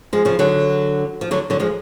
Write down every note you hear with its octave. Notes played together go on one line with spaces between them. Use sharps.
F3 G#3
C#3 F3
D3 F#3
F3
D3 F#3
D3 F#3
F3 G#3